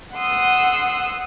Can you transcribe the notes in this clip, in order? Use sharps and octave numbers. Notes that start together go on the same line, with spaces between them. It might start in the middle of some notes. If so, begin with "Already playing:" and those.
F#5 C6 D#6 E6